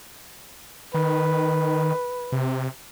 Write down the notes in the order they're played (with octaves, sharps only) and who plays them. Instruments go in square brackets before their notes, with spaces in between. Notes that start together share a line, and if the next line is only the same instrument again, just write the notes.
[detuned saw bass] D#3 [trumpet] B4
[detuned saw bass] C3